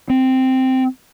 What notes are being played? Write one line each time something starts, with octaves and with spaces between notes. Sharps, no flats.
C4